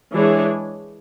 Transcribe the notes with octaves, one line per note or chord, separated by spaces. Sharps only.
E3 G#3 D4 G#4 C#5